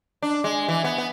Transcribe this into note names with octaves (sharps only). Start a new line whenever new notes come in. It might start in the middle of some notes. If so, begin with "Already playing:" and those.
D4
G#3
E3
B3
B3